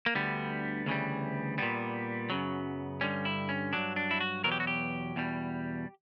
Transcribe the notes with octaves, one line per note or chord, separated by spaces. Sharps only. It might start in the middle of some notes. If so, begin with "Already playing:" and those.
A#3
D2 D3 G3 B3
D2 C#3 E3 G3
A#2 G3 B3
F#2 C#3 F#3
G2 D3 G3 C#4
E4
C#4
G2 F#3 D4
D4
E4
F#4
E2 B2 F#3 A#4
G4
F#4
G4
E2 B2 G3